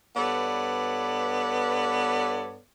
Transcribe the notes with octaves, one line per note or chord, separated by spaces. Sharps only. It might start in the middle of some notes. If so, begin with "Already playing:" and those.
G2 B3 A4 B4 C#5 D5